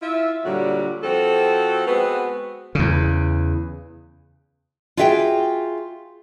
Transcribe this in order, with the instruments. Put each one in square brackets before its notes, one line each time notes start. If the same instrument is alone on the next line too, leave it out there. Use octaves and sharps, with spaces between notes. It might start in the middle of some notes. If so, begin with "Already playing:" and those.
[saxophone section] E4 F4 E5
A#2 D3 F#3 G3 F#4
F3 C4 F#4 A4
G#3 B3 C4 F#4 B4
[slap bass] E2 C#3
[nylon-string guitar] F4 F#4 G#4 E5 F5 G5